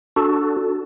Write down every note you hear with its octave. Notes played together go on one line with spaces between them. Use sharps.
D4 F#4 A4